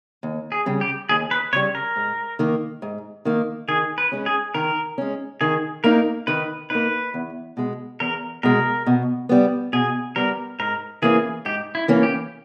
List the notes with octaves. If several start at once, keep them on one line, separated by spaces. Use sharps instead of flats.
D#2
G#4
C#3 G3
G4
D#2 G#4
B4
C#3 G3 C#5
A#4
G#2
D#3 A#3
G#2
D#3 A#3
D#3 G#4
B4
G#3 C#4
G#4
D#3 A#4
G#3 C#4
D#3 G#4
A#3 D#4 A#4
D#3 B4
A#3 D#4 B4
E2
B2 G#3
E2 A#4
B2 G#3 A#4
B2
G3 B3
B2 G#4
G3 B3 A#4
G#2 A#4
E3 A#3 C#4 G#4
G#2 G4
E4
E3 A#3 C#4
G4